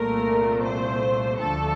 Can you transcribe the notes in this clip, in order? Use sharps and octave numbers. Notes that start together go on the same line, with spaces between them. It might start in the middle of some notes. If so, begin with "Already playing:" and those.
Already playing: C2 A#2 A3 A#4
C5
D2 D3 F3 A3 A4